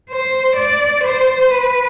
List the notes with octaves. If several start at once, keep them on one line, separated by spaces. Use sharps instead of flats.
C5
D5
C5
B4